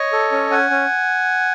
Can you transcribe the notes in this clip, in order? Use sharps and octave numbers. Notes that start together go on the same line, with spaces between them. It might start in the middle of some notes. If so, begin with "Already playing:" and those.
Already playing: C#5 D#5
A4
C#4
C#4 F#5 G#5
C#4